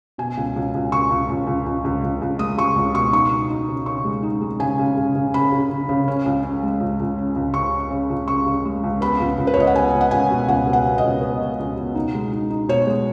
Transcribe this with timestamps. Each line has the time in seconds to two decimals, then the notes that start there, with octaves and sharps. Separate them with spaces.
0.18 B2 G#5
0.37 C#2
0.56 C#2
0.74 C#2
0.92 C#2 C#6
1.10 C#2
1.30 C#2
1.47 C#2
1.66 C#2
1.84 C#2
2.03 C#2
2.21 C#2
2.39 G#3 D#6
2.57 C#2 C#6
2.76 C#2
2.95 B2 C#6
3.12 D#4 C#6
3.31 D#4
3.50 D#4
3.69 C#3
3.86 C#3 C#6
4.05 G#3
4.23 D#4
4.41 G#3
4.60 C#3 G#5
4.79 C#3
4.98 C#3
5.15 C#3
5.34 C#3 B5
5.52 C#3
5.71 C#3
5.89 C#3
6.08 C#4
6.26 C#2
6.43 C#4
6.63 G#3
6.80 C#2
7.00 C#2
7.18 C#4
7.36 C#2
7.54 C#3 C#6
7.73 C#4
7.91 C#3
8.10 C#2
8.28 C#3 C#6
8.46 C#3
8.65 G#3
8.84 C#2
9.01 B3 B5
9.20 C#2
9.38 C#2
9.47 B4
9.54 C#5
9.57 C#2 D#5
9.67 F#5
9.75 B3 G#5
9.93 C#2
10.01 F#5
10.11 C#2 G#5
10.31 B2
10.48 C#2 F#5
10.67 B3
10.73 F#5
10.85 B3
10.98 D#5
11.04 C#2
11.21 B3
11.40 B2
11.59 C#2
11.77 B2
11.95 D#4
12.15 G#3
12.33 D#4
12.50 D#4
12.68 B2 C#5
12.87 G#3